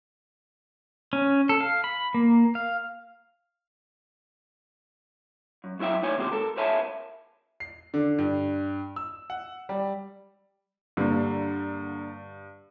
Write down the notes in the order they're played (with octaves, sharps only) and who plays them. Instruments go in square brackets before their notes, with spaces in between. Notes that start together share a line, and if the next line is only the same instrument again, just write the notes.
[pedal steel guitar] C#4
A4
F5
B5
A#3
F5
[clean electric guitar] F#2
F2 F#3 E4 E5 G5
A2 D#4 C#5 G#5
D#2 C3 G#3 F#4 G4
A4 A#4
A#4 C5 C#5 E5 G#5 A5
[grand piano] C7
D3
G2
E6
F#5
G3
[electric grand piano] G2 [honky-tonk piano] D3 A#3